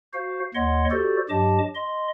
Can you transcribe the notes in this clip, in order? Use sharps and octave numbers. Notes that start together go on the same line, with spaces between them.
F#4 C5 F5
D#2 C#5 D#5 F#5 C6
F#4 G4 A4 C5 D5
G2 F#3 G4 D#5 A5 D6
D#5 C6